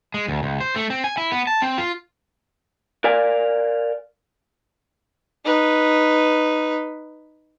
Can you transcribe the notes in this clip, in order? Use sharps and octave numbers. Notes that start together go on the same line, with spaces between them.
G#3
D2
C#2
C5
A3
C4
G#5
E4
B3
A5
C4
F4
A#4 D5 F5 G#5
D#4 B4